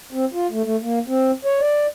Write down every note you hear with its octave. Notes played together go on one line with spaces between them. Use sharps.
C4
F4
A3
A3
A#3
C4
C#5
D5